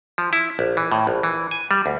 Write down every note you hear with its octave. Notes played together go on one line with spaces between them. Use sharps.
F3
E4
A#1
E3
A2
A#1
E3
G#5
G3
D2